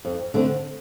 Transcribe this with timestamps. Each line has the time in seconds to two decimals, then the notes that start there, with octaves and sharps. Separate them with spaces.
0.05 F2
0.34 D3 A3 C4